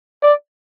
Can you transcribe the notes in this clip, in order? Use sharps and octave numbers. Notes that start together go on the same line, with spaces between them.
D5